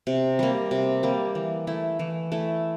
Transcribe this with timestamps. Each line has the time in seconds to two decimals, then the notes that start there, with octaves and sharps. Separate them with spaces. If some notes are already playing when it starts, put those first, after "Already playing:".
0.07 C3
0.39 G3 A#3
0.71 C3
1.03 G3 A#3
1.35 E3
1.67 A3 E4
1.99 E3
2.32 A3 E4